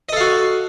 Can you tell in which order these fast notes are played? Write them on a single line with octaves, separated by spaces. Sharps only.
D#5 A4 F5 F#4